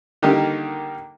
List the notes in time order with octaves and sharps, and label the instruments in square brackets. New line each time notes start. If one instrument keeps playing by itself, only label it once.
[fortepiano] D3 D#3 G3 A#3 D#4 G4